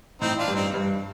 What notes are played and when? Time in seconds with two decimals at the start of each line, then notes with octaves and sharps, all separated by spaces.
0.21 A2 C4 D#4
0.38 D4 F4
0.48 G2
0.55 C4 D#4
0.74 G2